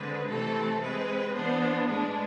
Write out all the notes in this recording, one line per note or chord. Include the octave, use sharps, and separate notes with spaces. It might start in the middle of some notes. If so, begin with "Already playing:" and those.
Already playing: D3 G#3 C4 B4
C3 E3 A3 C4 A4
C3 G#3 C4 B4
E3 B3 D4 C5
A2 G#3 D4 B4